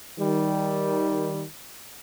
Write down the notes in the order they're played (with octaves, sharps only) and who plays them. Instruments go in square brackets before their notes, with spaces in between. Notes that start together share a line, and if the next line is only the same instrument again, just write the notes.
[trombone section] D#3 G3